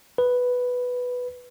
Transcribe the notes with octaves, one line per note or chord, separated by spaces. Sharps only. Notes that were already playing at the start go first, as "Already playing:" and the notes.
B4